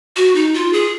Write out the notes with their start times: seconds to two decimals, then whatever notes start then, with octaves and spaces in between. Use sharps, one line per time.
0.16 F#4
0.35 D#4
0.54 F4
0.73 G#4